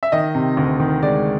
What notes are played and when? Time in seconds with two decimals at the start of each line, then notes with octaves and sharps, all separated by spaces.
0.03 E5
0.12 D#3 D#5
0.35 C3
0.57 D2
0.79 D#3
1.03 G#3 D5